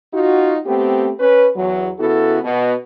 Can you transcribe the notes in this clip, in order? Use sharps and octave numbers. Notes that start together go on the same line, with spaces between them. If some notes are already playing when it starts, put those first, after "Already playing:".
D#4 F4 F#4
A3 B3 C4 G4
C#4 B4
E2 F#3
C#3 B3 E4 F#4 A4
B2